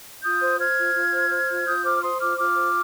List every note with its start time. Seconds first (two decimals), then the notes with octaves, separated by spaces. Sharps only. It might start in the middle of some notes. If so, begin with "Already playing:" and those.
0.23 F4 D#6 G6
0.42 C5
0.59 C5 F6 G#6
0.77 F4
0.95 F4
1.13 C5
1.31 C5
1.49 F4
1.66 F4 D#6 G6
1.84 C5 D6 F6
1.96 F6
2.02 C5 C6 D#6
2.20 F4 D6 F6
2.38 F4 D6 F6
2.56 C5